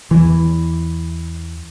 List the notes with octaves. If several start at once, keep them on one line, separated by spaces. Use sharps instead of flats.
E2 E3